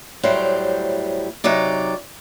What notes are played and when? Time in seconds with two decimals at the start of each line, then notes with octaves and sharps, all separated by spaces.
0.23 A2 F#3 G3 C5
1.44 C3 F#3 D#4 D5